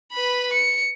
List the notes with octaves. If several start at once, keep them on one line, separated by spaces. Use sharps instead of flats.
B4 B5
C#7